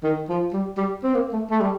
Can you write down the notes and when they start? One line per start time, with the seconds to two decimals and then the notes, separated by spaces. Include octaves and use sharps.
0.04 D#3
0.29 F3
0.53 G3
0.78 G3
1.03 C4
1.15 A#3
1.33 A3
1.51 A3
1.60 G3